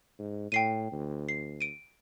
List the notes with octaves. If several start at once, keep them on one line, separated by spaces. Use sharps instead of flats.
G#2
A2 G5 C7 D#7
D2
C7
D7 D#7